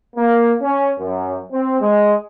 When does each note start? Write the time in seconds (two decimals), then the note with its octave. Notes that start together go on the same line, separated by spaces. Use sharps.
0.16 A#3
0.61 C#4
0.98 F#2
1.51 C4
1.81 G#3